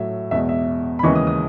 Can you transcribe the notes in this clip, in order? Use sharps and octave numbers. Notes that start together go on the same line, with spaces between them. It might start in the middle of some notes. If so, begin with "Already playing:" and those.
Already playing: A2 F#3 E5
E2 B2 G#3 E5
E5
B5
D#2 C#3 E3 G#3 C#6
D#6
D#6